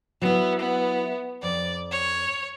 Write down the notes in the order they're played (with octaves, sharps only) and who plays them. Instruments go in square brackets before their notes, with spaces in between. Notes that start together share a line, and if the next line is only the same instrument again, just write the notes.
[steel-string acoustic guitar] F#3 E4 [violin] B3
[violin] B3
[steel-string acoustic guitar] F2 [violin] D5
[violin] C#5